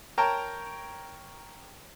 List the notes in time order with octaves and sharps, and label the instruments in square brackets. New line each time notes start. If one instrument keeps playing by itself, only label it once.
[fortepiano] A#4 C#5 G5 A5 A#5